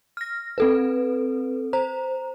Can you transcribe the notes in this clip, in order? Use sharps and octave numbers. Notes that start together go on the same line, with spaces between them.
F6 A#6
C4 A4 B4
C5 A#5